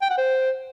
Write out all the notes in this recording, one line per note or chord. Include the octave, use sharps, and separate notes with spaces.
G5
F#5
C5